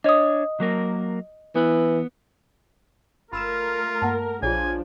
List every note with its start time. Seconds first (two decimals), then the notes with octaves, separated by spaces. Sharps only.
0.04 D4 C#5 D#5 D#6
0.60 F#3 A#3 A#4
1.55 E3 B3
3.33 G1 A3 F4 A#4 B5 E6 E7
4.02 G2 A#3 F#5 A5
4.43 A#1 F3 D4 F4 G#4 C#5 G#5